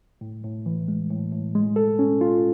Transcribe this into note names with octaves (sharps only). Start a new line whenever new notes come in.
A2
A2
E3
G#3
A2
A2
G#3
A4
C#4
F4